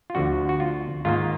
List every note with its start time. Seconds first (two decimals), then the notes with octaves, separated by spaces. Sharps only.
0.10 F4
0.15 D2 D3 F3 F#4
0.49 F#4
0.60 F4
1.05 G#2 D#3 A#3 F4